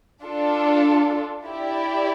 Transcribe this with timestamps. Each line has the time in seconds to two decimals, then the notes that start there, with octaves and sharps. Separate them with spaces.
0.23 D4 F4 A4
1.45 E4 G4 D5